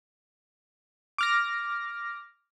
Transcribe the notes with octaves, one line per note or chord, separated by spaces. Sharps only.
D6 F6 A#6